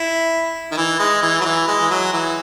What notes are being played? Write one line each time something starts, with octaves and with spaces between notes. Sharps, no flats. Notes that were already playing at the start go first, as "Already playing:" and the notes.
Already playing: E4
D#3
E3
G#3
E3
F#3
E3
G#3
E3
F#3
E3